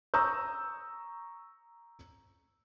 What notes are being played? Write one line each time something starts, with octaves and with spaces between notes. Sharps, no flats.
A#5 C#6 D#6 E6 G6